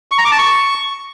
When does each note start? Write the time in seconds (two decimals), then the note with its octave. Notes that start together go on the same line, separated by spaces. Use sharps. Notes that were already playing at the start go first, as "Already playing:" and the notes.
0.12 C#6
0.18 A#5
0.25 D6
0.32 A5
0.38 C#6